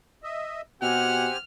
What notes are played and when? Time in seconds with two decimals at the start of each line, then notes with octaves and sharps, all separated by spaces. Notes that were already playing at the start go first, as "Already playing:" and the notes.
0.23 D#5 E5
0.82 B2 C4 G4 F#5 G#5 F6